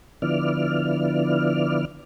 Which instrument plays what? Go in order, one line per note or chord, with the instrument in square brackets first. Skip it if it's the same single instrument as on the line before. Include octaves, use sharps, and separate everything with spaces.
[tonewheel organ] D3 F3 B3 E4 D5 F6